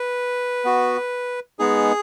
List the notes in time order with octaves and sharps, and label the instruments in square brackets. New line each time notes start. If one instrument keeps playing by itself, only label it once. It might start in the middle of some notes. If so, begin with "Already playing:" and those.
Already playing: [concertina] B4
B3 F#4
G#3 B3 D#4 G#4